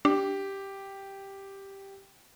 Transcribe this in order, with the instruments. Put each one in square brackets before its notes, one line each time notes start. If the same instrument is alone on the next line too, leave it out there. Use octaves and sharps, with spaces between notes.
[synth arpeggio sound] D4 [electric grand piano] G4